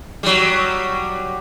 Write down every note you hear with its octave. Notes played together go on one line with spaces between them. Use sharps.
F#3 G3